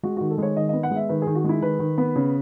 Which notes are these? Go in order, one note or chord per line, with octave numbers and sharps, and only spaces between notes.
G#3 F#4
D#3 F#4
A4
G#3 C#5
D#3 D#5
B3 D#5
F#5
G#3
E5
D#3 B4
D#3 G#4
F#4
G#3 E4
D#3 B4
D#3
B3
C#3